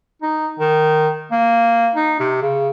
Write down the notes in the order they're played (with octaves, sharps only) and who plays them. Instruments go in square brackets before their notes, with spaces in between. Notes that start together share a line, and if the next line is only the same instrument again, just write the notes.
[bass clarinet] D#4
D#3
A#3
D#4
C3
C#3